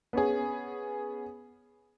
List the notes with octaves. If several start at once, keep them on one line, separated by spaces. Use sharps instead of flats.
B3 C#4 G#4